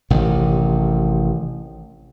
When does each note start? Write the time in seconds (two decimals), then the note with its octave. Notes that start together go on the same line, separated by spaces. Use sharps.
0.10 A1 C3 D#3